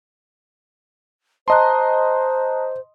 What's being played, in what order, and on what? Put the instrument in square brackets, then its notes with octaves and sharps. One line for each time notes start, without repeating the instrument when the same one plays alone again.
[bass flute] C5 [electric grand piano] D#5 C6 [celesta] A5 A#5 F#6